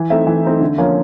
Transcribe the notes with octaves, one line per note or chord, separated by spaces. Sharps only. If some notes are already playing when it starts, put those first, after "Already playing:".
Already playing: E3
A3 C4 D#4 E5
E3
A3 C4 D#4
D3
F3 A#3 C#4